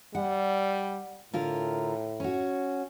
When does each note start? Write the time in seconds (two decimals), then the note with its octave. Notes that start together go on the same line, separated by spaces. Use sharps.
0.15 G3 F#5
1.34 A2 D3 F4 A#4
2.20 C#4 F#4